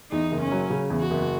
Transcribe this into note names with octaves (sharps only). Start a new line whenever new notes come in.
E2 D#4
F#1
C#4
F#3
C#3
E2
F#4
F#1